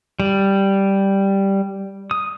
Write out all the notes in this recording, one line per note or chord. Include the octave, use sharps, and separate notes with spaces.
G3
D#6